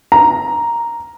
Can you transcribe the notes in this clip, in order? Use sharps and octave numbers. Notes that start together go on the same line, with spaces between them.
A#5